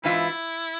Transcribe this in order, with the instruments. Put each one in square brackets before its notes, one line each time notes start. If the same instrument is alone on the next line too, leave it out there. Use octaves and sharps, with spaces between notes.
[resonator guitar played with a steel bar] G#2 E3 F4 [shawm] E4